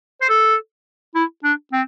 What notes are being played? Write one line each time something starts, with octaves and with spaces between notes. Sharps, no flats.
C5
A4
E4
D4
C4